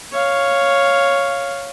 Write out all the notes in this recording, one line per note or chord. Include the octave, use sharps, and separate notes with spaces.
C#5 F5